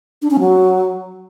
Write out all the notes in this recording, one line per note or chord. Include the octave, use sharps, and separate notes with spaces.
D4
C#4
F#3